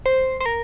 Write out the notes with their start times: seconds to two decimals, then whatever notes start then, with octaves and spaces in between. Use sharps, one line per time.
0.06 C5
0.41 C5
0.46 A#4